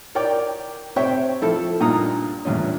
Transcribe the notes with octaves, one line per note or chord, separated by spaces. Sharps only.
A#4 C#5 D5 G5 D6
C3 C5 C#5 E5 G5 C#6
F3 E4 A4
G2 A#2 D#4 A#5 D#6
E2 G2 A#2 C#4